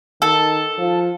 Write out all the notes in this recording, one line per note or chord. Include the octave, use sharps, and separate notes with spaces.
D#3 A4
F3